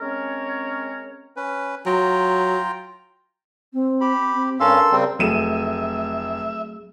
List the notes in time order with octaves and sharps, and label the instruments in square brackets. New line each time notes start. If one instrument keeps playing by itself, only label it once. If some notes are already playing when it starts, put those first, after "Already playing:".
[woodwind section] G#3 C4 C#4 A#4 C#5
[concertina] C#4 B4
[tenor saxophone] F#3 [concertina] F4 G5 A#5
[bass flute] C4
[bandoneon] G4 [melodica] B5
[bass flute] C4
[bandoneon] G2 C#4 F5 [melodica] A4 C6 E6 [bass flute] A#4
[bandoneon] C#3 G3 C4
[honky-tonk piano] F1 D#7 E7 [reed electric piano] F#3 A3 G#4 [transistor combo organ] E5